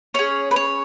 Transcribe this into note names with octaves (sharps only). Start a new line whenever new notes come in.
C#4 G#4 C#5
B4
C#5